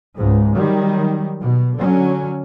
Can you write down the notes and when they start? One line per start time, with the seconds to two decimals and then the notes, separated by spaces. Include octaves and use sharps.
0.15 C#2 G#2
0.56 D#3 F#3 G3
1.41 B2
1.76 D3 F#3 C#4